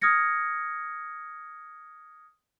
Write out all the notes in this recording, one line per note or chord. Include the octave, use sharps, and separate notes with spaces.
D#6 F6 G#6 A#6 C#7